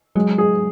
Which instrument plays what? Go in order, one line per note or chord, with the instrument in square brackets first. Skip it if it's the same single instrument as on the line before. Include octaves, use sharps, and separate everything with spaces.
[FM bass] F#3 [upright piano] G#3
[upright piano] G#4